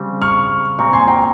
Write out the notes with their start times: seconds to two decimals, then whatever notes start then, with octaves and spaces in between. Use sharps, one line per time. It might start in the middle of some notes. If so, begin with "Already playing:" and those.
Already playing: C#3 G3 C4
0.22 C#6 F6
0.79 A#2 G#3 C4 F4 G#4 A#5 C#6
0.93 G#5 C6
1.07 G5 A#5